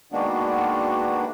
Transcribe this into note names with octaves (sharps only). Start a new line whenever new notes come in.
D#3 G#3 A#3 B3 D4 F#4